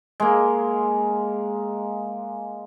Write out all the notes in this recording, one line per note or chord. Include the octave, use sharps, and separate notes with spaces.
G#3 A#3